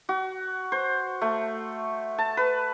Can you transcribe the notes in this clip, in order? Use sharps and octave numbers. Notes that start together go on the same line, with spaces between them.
F#4
C5
A3
A5
B4